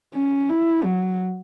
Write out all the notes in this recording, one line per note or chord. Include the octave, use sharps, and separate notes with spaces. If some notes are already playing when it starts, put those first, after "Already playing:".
C#4
E4
F#3